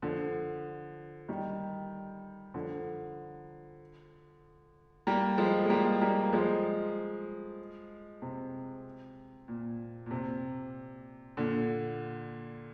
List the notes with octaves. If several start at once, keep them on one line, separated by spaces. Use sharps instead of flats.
D3 F3
D#3 G3
D3 F3
G3 A#3
F3 G#3
G#3
G3 A#3
G3 A#3
A#3
F3 G#3
C3
A#2
A#2
C3
A#2 D3